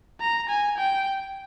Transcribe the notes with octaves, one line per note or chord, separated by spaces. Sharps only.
A#5
G#5
G5